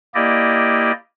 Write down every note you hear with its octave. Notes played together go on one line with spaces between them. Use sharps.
A#3 E4 G4 D5 D#5